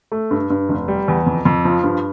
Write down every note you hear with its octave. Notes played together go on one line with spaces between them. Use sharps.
A3
G2
G2
F1
G3
E2
F2
F2
F3
G2